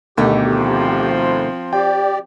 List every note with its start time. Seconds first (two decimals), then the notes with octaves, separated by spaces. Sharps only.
0.17 D2 B2 D#3 A3 G4
0.55 F3 C4
1.73 G4 D5 G5